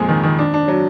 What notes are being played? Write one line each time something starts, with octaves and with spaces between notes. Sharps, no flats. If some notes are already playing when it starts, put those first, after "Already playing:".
Already playing: F2 A#2 G#3
D#3
D#3
D4
D4
F#3